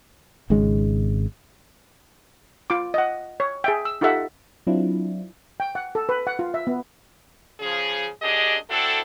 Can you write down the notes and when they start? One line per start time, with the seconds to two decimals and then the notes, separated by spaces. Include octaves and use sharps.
0.50 G#1 G#2 C#3 G#3
2.70 F4 D6
2.94 D#5 F#5
3.40 C#5
3.64 G#4 E5 G5
3.85 E6
4.01 D#4 F4 G4 A4 E5 F#5
4.67 F#3 C4 D4 E4 F4
5.60 G5
5.75 F#5
5.95 A4
6.09 B4
6.27 F#5
6.39 F4
6.54 E5
6.67 B3
7.60 C#3 F3 G#4
8.22 F#2 D4 G4 G#4 D#5
8.70 C4 D4 E4 F#4 A4